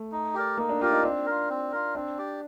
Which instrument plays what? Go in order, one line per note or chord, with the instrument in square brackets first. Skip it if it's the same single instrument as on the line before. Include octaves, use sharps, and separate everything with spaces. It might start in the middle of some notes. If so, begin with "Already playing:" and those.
Already playing: [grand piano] A3
[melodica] D#4
G4 A#4 D5
[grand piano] A#3 [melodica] D#4
[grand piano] D4
[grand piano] F4 [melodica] G4 A#4 D5
[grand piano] D#4
[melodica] C4 [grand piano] D4
[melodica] F4 A#4
C4
F4 A#4
[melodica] C4 [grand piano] D4
[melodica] G4 D5